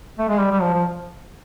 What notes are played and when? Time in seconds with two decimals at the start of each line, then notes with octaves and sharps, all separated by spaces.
0.19 A3
0.29 G#3
0.40 G3
0.51 G3
0.62 F3
0.74 F3